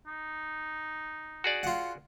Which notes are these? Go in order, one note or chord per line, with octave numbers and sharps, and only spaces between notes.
D#4
F#4 G#4 D5
F4 F#5